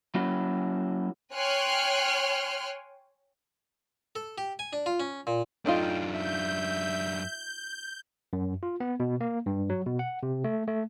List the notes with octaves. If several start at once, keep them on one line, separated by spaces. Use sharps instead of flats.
F#3 A#3 C#4 E4 F#4
C#5 G5 G#5 C6 F6 F#6
A4
G4
G#5
D4
F4
C#4
A#2
F#2 A3 D4 D#4 F4 G5
E5 G6
F#2
F4
B3
B2
A#3
G2
F#3
B2
F#5
C3
A3
A3